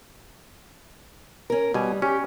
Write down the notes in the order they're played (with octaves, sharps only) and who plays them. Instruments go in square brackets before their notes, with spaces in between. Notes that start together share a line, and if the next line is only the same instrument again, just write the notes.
[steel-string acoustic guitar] C#4 A#4
[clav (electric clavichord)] B2 G#5 [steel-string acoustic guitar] G3
[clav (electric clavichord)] C#4 [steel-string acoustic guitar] G4